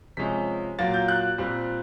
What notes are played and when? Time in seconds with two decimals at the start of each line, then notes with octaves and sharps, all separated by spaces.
0.17 C3 F3 G#3 C#4 B6
0.79 A#2 F#3 A#3 A6
0.94 G6
1.08 F#6
1.38 A#2 G3 C4